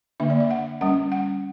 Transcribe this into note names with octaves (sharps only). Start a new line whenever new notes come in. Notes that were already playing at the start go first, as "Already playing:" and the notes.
D3 A#3 D4 E5
D5
E5
F#5
G3 C#4 F#5
F#5